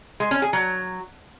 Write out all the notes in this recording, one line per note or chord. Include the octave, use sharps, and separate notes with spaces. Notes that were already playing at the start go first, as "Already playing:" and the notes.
G#3
C#4
G#4
F#3